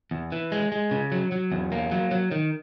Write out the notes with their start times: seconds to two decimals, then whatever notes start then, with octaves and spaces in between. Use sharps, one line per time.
0.11 E2
0.32 E3
0.52 G#3
0.72 G#3
0.91 C#3
1.12 F#3
1.32 F#3
1.52 E2
1.72 A#3
1.91 F#3
2.11 F#3
2.31 D#3